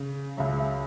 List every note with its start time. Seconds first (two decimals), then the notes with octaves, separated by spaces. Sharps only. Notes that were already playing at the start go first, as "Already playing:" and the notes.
Already playing: C#3
0.37 C#2 C#3 F#3 E5
0.59 E5